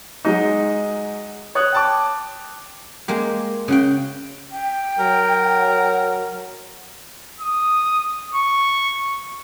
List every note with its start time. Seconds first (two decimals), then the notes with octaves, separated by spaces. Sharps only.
0.25 F#3 G#3 D#4
1.55 C#5 D#6 F#6
1.73 G5 A5 D6
3.08 G#3 A#3 G4
3.68 C#3 F#4 G5
4.51 G5
4.99 F#3 A#4
7.40 D#6
8.35 C#6